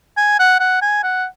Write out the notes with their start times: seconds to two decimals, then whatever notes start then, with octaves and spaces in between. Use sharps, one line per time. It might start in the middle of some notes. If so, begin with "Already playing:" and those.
0.17 G#5
0.39 F#5
0.60 F#5
0.82 G#5
1.03 F#5